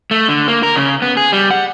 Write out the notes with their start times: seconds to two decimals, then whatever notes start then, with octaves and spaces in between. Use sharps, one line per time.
0.11 A3
0.28 D3
0.48 A#3
0.63 A#4
0.76 C#3
1.02 B3
1.17 G#4
1.33 G3
1.51 F#5